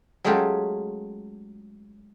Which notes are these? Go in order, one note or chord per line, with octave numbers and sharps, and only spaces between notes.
F#3 G#3 A3 C#4 F4 G4